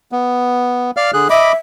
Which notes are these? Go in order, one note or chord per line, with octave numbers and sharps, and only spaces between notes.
B3
D5 F5 F6
D3 G#4 F#6
D#5 E5 B5 D6